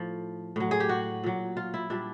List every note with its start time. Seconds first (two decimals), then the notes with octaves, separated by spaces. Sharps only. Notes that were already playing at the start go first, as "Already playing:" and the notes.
Already playing: A2 F3
0.56 A2 F#3
0.71 G#4
0.80 G4
0.89 F#4
1.24 A#2 F#3
1.57 F4
1.74 E4
1.90 A#2 G3 D4